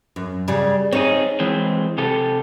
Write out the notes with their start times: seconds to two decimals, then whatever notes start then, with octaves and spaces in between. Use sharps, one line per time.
0.16 F#2
0.48 C#3 G3
0.93 C4 D#4 G#4 C#5
1.40 E3 G#3 C4
1.98 C3 G4 A4